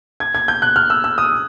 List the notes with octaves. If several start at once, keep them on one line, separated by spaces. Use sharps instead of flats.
G#6
G#6
G6
F#6
F6
E6
E6
D#6